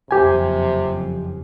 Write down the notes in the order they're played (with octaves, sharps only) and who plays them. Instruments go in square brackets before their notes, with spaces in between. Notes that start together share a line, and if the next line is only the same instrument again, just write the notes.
[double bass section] F#1 F2 [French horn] C3 [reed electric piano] G4 G#5